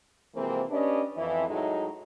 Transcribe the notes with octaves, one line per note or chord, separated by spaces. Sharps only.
C3 E3 F3 G#3 A#3 C4
C#4 D4 G4 B4 D5 D#5
F2 E3 E4
A2 F#3 G#3 A3 D#4 E4